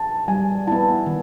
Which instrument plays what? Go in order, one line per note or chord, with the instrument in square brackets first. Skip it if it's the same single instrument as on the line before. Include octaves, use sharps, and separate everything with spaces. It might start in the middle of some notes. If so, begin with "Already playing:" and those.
Already playing: [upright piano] A5
[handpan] G3 [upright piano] G#5
[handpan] B3 E4 [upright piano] A5
[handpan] D#3